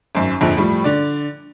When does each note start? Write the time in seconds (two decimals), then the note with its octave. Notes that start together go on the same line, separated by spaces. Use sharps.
0.15 G#1 F#2
0.41 A#1 F2 D3 F3
0.57 A2 F3 G3
0.84 D3 D5